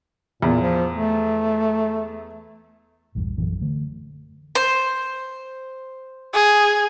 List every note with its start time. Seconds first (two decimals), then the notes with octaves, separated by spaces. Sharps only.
0.42 E2 A#2
0.61 F3
0.93 A3
3.15 A#1 E2 G2
3.37 A#1 F#2 E3 F#3
3.61 D3 A3
4.55 C5
6.34 G#4